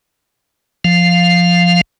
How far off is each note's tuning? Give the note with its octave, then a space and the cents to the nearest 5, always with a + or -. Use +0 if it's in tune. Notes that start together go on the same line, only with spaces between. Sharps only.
F3 +0 F5 +0